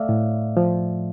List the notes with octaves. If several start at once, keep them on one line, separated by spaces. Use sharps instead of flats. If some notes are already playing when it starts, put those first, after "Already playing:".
Already playing: A3 D5 E5 F5
A2
F3